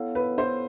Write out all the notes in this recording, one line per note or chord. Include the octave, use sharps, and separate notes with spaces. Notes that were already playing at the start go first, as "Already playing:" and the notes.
Already playing: B3 E4 A4 C#5 F5
B4
C5